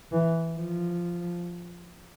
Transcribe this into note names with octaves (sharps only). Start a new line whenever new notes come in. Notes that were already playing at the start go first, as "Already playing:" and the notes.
E3
F3